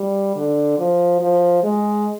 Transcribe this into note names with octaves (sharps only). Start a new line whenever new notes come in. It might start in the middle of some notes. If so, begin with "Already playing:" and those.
Already playing: G3
D3
F3
F3
G#3